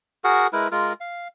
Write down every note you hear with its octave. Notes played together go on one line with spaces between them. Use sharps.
F#4 G#4 A#4 F#5
G#3 E4 A#4 B4
G#3 F4 A#4
F5